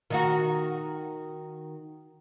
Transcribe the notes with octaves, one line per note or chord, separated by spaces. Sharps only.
D#3 D#4 F#4